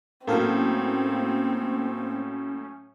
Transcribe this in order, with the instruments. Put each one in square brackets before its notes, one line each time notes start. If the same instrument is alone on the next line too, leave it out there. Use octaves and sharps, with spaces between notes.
[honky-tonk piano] A2 F#3 [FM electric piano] A#3 A4 F5 [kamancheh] C4 [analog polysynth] C#4